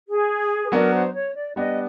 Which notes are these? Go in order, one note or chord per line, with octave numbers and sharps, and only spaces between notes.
G#4
B4
F#3 B3 D4 F#4 A#4
C5
C#5
D5
G3 B3 D4 D#5